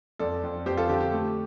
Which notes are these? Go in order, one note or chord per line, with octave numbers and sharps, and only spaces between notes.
F2 A4 D5
F2
F2 G4 C5
F4 A4
D3 G4
G4
A3